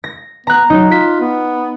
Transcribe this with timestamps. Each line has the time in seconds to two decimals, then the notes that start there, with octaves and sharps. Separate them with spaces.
0.04 A#6
0.47 B3 A#5 F#6
0.70 F#3 D#4
0.91 F4 B6
1.21 B3